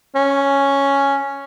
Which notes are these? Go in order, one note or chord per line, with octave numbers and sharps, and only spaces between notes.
C#4